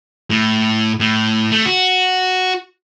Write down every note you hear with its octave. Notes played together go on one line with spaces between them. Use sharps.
A2
A2
A3
F#4